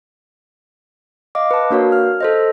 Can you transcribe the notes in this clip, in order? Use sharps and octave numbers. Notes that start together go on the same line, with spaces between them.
D#5 F5 D6
B4 A5
A#3 D4 F#4 A#4 C#5 F5
F6
A4 C5 D#5